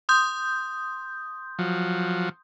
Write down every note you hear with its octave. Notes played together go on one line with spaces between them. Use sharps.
C6 D#6 G6
F3 F#3